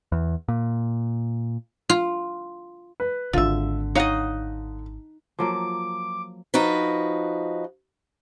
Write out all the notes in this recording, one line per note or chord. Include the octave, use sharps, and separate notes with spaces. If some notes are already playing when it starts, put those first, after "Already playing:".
E2
A#2
F4
B4
D#1 G#1 D3 F4 E5
D#4 C#5 D#5 F5 F#5
F3 F#3 A#3 D6
F3 D#4 F#4 B4